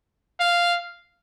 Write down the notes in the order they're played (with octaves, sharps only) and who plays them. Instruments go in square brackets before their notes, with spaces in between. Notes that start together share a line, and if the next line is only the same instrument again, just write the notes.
[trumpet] F5